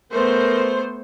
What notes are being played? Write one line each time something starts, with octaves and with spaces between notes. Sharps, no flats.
A3 B3 A#4 C5